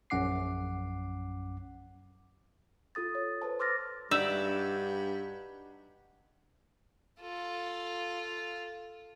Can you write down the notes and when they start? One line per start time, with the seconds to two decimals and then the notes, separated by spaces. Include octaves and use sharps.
0.10 A#1 F#2 C#4 F#5 D6 C7
2.95 F4 A4 D#6 A6
3.15 C#5
3.42 B4 C5 A5
3.59 C6 D6 E6 F6 A6 A#6
4.11 G2 D4 D#4 F#4 D5 E5
7.21 F4 A4